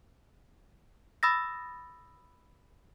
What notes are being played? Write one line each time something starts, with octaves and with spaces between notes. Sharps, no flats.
B5 D#6 E6 A6 A#6